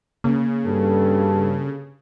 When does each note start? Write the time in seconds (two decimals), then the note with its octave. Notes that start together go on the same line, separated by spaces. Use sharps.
0.24 C#3 A#3
0.65 G2 A4